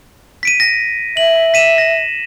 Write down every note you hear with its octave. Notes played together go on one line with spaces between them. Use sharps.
B6 D7 D#7
A#6
E5 F#7
B6 D#7 E7
A#6